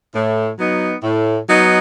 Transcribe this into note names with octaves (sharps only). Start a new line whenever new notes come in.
A2
F#3 B3 D#4
A2
F#3 B3 D#4